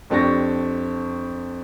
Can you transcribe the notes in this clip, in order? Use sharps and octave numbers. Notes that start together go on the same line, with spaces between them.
F2 D4 G4 C#6 A#6